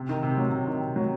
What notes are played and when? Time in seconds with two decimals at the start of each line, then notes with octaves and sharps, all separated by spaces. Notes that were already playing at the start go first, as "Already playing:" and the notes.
Already playing: C3
0.09 D#3
0.23 C3
0.37 F#3
0.52 C3
0.67 D#3
0.81 C3
0.96 F#3